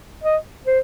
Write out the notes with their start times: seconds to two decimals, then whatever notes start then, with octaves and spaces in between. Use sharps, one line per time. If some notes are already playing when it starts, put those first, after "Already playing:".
0.24 D#5
0.66 C5